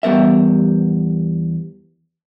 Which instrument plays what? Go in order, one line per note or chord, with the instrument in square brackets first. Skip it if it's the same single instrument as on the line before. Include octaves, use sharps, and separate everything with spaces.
[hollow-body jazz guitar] E2 G3 B3 A#4 E5